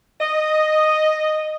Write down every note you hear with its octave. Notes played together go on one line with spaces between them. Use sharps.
D#5